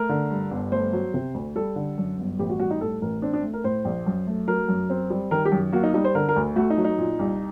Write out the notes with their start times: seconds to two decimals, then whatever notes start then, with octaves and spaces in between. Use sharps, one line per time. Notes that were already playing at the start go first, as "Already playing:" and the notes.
Already playing: A3 A#4
0.09 D3
0.31 G2
0.51 G1
0.72 A3 C5
0.93 F#3
1.14 C3
1.34 D2
1.56 G3 A4
1.76 D3
1.98 F#2
2.18 G1
2.39 A1 G4
2.49 F#4
2.60 G3 F#4
2.71 D#4
2.81 A2 A4
3.02 A1 A#4
3.22 C4 D4
3.33 D4
3.43 A3
3.53 A#4
3.64 A2 C5
3.85 A#1
4.07 F#2
4.27 A3
4.48 F#3 A#4
4.69 F#2
4.90 C4
5.10 G3
5.31 D#3 A#4
5.45 G4
5.52 F#2
5.72 A#3 F#4
5.83 D#4
5.94 G3 D#4
6.04 C5
6.15 D3 A#4
6.29 A#4
6.36 D2
6.56 A3 F#4
6.70 D#4
6.77 F#3
6.85 D#4
6.98 A#2
7.19 C2